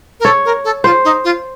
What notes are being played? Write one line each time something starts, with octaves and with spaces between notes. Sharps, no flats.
A#4
A4 C#5
A#4
A4
F4 C5
D#4
F4